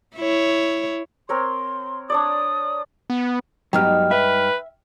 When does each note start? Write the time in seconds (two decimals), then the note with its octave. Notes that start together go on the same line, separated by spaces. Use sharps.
0.16 E4 C#5
1.29 C4 A#4 C#5 C6
2.10 D4 C#5 D5 D#6
3.10 B3
3.73 G2 F#3 G#3 B3 D#4 G4 G5 F6
4.11 B4 E5